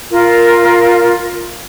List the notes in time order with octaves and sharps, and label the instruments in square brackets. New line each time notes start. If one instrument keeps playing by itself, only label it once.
[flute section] F4 A#4